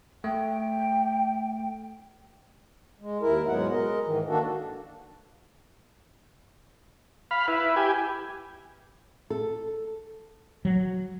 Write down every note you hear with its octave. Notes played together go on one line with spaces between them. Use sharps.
A3 G5
G#3
D#2 E4 A#4
G#2 B2 F#3 G#3 B3 F#5
G#3 A#4 D#5
G#2 D#3 E3
D#3 A#3 D4 F#4 A4
F5 B5
E4 B4
G4 G#5
A4
F#3